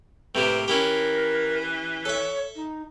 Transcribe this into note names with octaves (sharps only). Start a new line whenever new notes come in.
A2 C3 A#3 C4 B4
E3 C#4 E4 G4 A#4
A4 C#5 E5
D#4